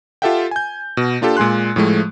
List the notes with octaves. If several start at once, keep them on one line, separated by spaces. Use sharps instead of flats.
F4 G4 A4 E5 F#5 G5
G#5 G6
B2
A#3 D4 F4 G4 A4
A#2 G#3 G#5 C6 F#6
A2 F3 G#3 A3